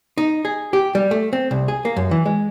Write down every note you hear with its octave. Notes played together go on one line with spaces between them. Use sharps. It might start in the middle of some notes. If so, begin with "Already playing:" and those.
D#4
G#4
G4
G3
A3
C4
C2
G#4
A#3
F#2
E3
G#3